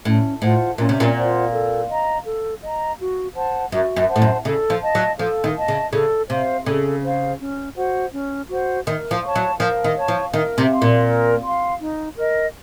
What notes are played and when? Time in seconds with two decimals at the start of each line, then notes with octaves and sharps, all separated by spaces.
0.05 A2 C#4
0.42 A2 F4 C5 F#5
0.78 A#2 C#4
0.89 C3
1.00 A#2
1.15 F4 C5 F#5
1.52 A4
1.89 D#5 A#5
2.25 A4
2.63 D#5 A#5
2.99 F#4
3.35 C5 F#5 A5
3.72 F#2 F#4
3.96 F#2
4.09 C5 F#5 A5
4.16 A2
4.22 F#2
4.45 C#3 A4
4.70 F3
4.82 D#5 A5
4.95 F#3
5.19 F3 A4
5.44 D#3
5.56 D#5 A5
5.68 C#3
5.93 C#3 A4
6.29 C3 C5 F5
6.66 C#3 A4
7.03 C5 F5
7.39 C#4
7.76 F#4 C5 F#5
8.13 C#4
8.50 F#4 C5 F#5
8.87 D#3 A#4
9.11 F3
9.23 C#5 A5 C#6
9.35 F#3
9.60 F3 A#4
9.84 D#3
9.96 C#5 A5 C#6
10.08 F3
10.33 D#3 A#4
10.58 C3
10.71 F5 C6
10.82 A#2
11.06 A#4
11.43 F5 C6
11.80 D#4
12.17 A#4 D#5